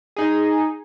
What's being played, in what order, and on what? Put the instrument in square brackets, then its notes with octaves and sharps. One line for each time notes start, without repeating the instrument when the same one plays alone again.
[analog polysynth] D#4 G#4